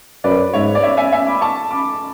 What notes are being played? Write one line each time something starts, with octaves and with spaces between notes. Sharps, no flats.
F#2 B4 D5
G#2 C#5 E5
D5
C#5 E5
E5 G#5
E5 G#5
B5 D6
A5 C#6
B5 D6